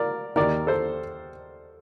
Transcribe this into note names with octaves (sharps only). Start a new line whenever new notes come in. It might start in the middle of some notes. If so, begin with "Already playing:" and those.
Already playing: A#4 D5
D#2 D#3 A#4 D5
A4 C5